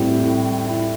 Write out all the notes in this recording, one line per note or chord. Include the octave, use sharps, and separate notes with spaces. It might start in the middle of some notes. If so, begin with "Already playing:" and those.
Already playing: A2 G3 C4 E4
E4
E4